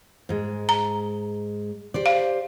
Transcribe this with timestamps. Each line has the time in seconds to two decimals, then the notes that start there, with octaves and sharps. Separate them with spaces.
0.29 G#2 G#3
0.69 A#5
1.94 G4 C5 D5
2.06 F5